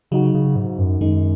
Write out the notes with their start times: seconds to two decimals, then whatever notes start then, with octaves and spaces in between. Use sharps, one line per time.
0.11 C#3 F#3 D#4 F#4
0.34 C#3
0.56 G#2
0.78 F#2
1.01 F#2 D#3 G#3 D#4